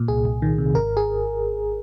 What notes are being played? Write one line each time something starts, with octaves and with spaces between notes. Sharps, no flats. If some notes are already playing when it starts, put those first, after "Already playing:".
Already playing: A#2
C2 G#4
C2
D#3
C3
G#1 A#4
G#4